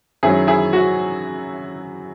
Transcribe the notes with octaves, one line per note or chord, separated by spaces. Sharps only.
F#2 D#3 F#3 E4 G#4
E4 G#4
F#4